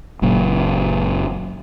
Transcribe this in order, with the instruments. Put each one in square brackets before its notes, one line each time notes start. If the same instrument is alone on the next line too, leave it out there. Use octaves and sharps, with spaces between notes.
[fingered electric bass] F#1 F#2 A#2